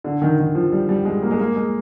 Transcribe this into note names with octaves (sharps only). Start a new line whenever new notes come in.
D3
D#3
D#3
F3
G3
G3
G#3
A#3
G#3
A#3
G#3